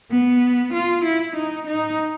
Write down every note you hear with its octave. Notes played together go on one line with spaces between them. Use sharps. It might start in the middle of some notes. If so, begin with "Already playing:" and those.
B3
F4
E4
D#4
D#4